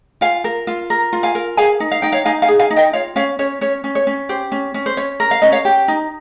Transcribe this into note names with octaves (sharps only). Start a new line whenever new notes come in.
F4 F5 G#5
A#4
F4
A#4
F4
F5 G#5
A#4
G#4 F5 G#5
D#4
F5
D#4 G5
C#5 F5
D#4 F5 G#5
F5 G#5
G#4
F5 G#5
D#4
D#5 G5
F4 C#5 F5
C#4 C#5 F5
C#4 C#5
C#4 C#5
C#4
C#5
C#4
G4 C5
C#4
C#4
C5
C#4 C#5
A#4
F5
C#4 D#5
C#5 F5
G4
D#4